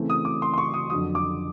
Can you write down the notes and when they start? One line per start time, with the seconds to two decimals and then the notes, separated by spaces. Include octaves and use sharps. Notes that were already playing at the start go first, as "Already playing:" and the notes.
Already playing: C#3 E3 A3 C4
0.10 D#6
0.25 D6
0.42 C6
0.54 C6
0.58 C#6
0.74 D#6
0.90 F2 D3 F#3 D#6
1.15 D6